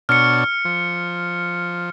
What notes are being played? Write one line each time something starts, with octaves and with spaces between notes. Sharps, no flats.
B2 D4 C#5 F6 C#7
F3